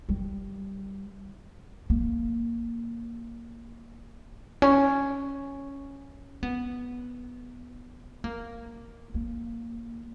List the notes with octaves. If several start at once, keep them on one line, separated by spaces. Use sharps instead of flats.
G3
A#3
C#4
B3
A#3
A#3